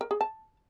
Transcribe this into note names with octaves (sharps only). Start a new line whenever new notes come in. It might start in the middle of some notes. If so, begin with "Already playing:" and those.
A#4
G#4
A5